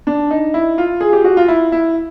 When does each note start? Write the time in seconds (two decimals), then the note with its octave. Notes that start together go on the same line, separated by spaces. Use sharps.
0.07 D4
0.31 D#4
0.54 E4
0.78 F4
1.01 G#4
1.13 G4
1.24 F#4
1.37 F4
1.48 E4
1.72 E4